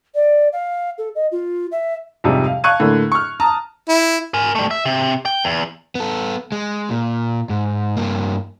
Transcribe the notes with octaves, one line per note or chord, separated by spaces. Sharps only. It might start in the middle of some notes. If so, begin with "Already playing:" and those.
D5
F5
A4
D#5
F4
E5
F2 G#2 C3 F3 G3 G#3
F5
F5 A5 C#6 F#6 G#6 D#7
A2 D3 A#3
C#6 F6
A5 A#5 D#6
E4
A#4 G#5
G3 A3
E5
C3
G5
E2
B3 A4
G#3
A#2
G#2
G2 A#3